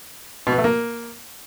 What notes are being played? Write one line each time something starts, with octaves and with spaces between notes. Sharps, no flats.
B2
B3
A3
A#3